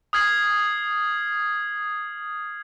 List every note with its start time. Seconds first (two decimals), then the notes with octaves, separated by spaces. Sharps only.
0.13 D#6 F6 G#6 C7 F#7